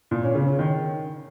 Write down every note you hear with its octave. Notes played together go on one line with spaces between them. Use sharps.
A#2
C#4
C#3
C#4
D#3